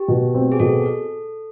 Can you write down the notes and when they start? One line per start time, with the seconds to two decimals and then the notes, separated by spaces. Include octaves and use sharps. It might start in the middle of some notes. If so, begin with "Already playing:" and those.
Already playing: G4
0.08 B2
0.34 C4
0.52 G#4
0.60 B2 A4